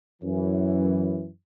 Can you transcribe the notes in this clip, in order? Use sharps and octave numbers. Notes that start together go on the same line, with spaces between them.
F#2 E3